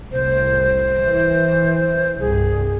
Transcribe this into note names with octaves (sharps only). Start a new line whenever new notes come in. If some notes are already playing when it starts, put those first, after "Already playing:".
C2 A2 C5
E3
C2 G2 G#4